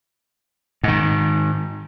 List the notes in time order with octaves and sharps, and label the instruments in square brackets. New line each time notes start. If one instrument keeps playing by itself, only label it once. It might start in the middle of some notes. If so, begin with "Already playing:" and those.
[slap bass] G#2 D#3